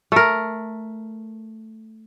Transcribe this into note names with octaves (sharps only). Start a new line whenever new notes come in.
A3 A#4